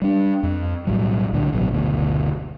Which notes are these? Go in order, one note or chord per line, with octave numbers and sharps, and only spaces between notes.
G3 D4
F2
B1 A2 F#3 G3
C#2 A#2 D3
A1 B2 F#3
F#1 D2 B2